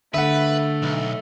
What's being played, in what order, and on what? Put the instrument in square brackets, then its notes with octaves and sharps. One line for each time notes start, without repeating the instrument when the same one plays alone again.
[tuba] D3 [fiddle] A3 [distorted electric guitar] B4 [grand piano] E5 F#5
[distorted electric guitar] B1